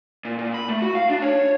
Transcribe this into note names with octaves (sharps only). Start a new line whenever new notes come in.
A#2
A#2
B5
A3
F#4
F5
D4
C#5